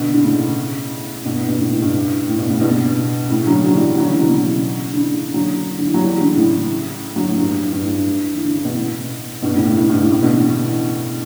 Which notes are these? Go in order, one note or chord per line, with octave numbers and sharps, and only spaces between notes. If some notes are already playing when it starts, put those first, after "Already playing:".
Already playing: B2 D3
D3
A2 C#3
G2 B2
A2
G2 B2
A2 C#3
A2
G2
A2
G2 B2
A2 C#3
G2 B2
A2 C#3
D3 F#3
D3 F#3
E3 G3
D3 F#3
C#3 E3
B2 D3
C#3 E3
D3
C#3 E3
D3 F#3
D3
E3
F#3
E3 G3
D3
C#3 E3
A2 C#3
D3 F#3
A2
G2
G2
A2
G2
E3
D3
C#3
B2
A2
G2 B2
A2 C#3
A2
A2
G2
A2
A2 C#3
B2 D3
C#3 E3